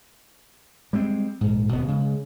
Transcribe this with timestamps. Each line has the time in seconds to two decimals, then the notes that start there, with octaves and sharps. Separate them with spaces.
0.93 G3 G#3 C4
1.41 A#1 G#2
1.72 D1 B2 B3
1.87 C#3 G#3